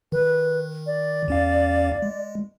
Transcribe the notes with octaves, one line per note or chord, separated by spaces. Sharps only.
D#3 B4
D5
E2 C#4 F5
G#3